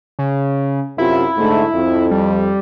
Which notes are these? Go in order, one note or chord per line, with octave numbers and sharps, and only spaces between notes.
C#3
F#2 C3 E4 F4
G#2 D3 A3
F2
G3